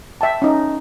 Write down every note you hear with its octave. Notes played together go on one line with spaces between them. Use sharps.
E5 G5 A5
C#4 D#4